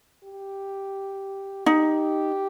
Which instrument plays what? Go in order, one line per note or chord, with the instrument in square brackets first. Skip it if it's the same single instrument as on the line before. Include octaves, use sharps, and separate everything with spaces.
[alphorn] G4
[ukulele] D#4 [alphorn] G4